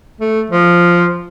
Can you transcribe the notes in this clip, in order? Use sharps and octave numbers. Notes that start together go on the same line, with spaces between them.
A3
F3